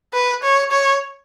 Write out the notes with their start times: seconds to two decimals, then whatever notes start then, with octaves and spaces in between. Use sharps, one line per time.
0.14 B4
0.43 C#5
0.72 C#5